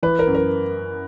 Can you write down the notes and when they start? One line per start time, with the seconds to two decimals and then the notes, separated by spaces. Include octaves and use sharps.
0.03 E3 B4
0.19 A#4
0.27 F#2
0.35 A#4